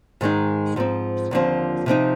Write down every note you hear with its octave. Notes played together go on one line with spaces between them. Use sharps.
G#2 D#3 G#3 D#4
G#2 F3 C4
D#2 D3 F3 C4
C3 F3 C4 D#4